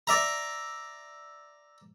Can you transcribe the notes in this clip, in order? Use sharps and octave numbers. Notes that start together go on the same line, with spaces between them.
D5 E5 A#5